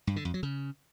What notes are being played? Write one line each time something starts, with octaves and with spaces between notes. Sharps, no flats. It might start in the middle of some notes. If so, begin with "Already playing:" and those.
G2
D3
F2
F#3
C#3